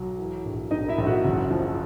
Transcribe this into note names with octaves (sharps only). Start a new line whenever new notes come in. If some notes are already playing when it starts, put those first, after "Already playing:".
Already playing: B1 F#3
E3
A#1
A#1 D#4 D#5
E4 E5
A#1
F#4 F#5
F#1
F3